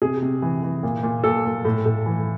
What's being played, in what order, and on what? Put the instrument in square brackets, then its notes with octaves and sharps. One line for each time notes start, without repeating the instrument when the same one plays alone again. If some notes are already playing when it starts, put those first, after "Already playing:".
[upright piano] C3 G#4
C3
E3
E3
A#2
A#2
A#2 A4
A#2
A2
A2
E3